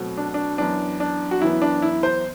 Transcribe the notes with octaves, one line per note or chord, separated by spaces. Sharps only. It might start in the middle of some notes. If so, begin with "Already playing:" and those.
Already playing: B2 F#3 A3 C4
D4
D4
F#2 E3 B3 D4
D4
F#4
F#2 E3 B3 E4
D4
E4
C5